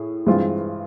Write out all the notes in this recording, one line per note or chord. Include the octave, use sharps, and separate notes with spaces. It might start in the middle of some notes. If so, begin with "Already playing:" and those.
Already playing: A2 G#4
G2 E3 G#3 C4 F4